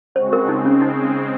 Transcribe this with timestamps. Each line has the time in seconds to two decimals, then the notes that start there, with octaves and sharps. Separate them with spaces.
0.15 C#3 G#3 C4 F#4 C5
0.33 A#4
0.49 C#3 G#3 C4 D#4
0.65 C#4
0.82 D#4